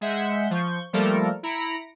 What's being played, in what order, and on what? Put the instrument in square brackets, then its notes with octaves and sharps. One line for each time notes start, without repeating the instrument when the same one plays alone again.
[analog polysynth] G#3 E5 F#5 G6
F3 C#6 G6
F3 G3 A3 A#3 A4 A#4
E4 A#5 B5 A#6 C#7 D7